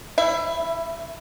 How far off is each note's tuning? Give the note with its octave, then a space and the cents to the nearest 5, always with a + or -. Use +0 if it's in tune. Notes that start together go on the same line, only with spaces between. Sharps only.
E4 +0 E5 +25